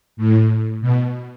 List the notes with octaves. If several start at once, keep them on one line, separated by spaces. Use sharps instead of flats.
A2
B2